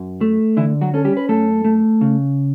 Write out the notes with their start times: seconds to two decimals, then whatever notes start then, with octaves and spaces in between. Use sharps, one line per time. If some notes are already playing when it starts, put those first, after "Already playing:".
Already playing: F#2
0.21 A3
0.57 D3 E3 E4
0.81 F#3 F#4
0.94 C#4 A4
1.05 G3 G4
1.17 B4
1.29 F#2 A3 A4
1.64 A3
2.01 C#3